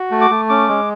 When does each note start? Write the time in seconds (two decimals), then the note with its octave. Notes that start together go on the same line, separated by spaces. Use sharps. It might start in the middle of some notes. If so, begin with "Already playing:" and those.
Already playing: F#4
0.11 A3
0.21 D6
0.30 A3
0.49 C#4 D6
0.69 G#3